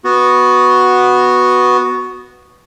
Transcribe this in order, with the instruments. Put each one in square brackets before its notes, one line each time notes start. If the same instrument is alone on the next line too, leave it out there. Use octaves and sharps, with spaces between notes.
[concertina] B3 F#4